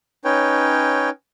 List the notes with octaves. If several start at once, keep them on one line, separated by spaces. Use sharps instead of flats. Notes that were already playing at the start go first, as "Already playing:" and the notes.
C#4 D#4 B4 C#5 G5